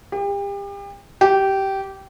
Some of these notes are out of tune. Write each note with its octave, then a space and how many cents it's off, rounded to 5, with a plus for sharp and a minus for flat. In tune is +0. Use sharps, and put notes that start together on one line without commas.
G4 +35
G4 -15